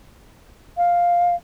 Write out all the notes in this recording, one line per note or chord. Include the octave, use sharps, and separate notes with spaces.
F5